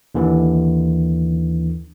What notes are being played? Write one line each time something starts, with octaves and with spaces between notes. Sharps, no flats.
D#2 D3 E3